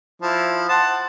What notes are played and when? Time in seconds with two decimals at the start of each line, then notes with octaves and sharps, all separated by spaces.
0.22 F3 E4
0.69 F#5 A5 C6